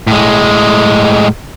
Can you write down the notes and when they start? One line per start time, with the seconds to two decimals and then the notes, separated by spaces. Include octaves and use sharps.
0.07 A2 G#3